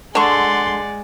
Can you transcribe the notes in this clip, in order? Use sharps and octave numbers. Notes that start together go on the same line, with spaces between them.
D3 G#3 D5 F#5 C6 C#6